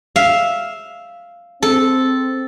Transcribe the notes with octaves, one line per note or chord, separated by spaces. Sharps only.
E5 F5
C4 A4